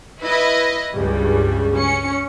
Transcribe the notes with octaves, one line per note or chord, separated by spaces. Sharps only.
E4 B4 D#5
C#2 G2 C#3 G3
C#4 C#7